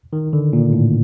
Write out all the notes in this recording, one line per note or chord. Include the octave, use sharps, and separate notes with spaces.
D#3
D3
A#2
A2